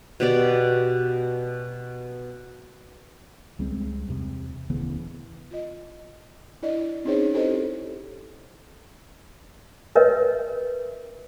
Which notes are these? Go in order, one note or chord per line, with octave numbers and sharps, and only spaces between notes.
B2 G4 D5
C#2 G3 G#3 C4
E2 C3
D1 C#3 E3 B3
F4 D#5
D4 E4 D5 D#5
C4 C#4 D#4 G#4 C5 C#5
E4 G4 A4 C5 D#5
A#4 B4 C#5 D#5 E5